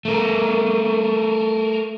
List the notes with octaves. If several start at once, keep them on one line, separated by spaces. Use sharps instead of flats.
A3 A#4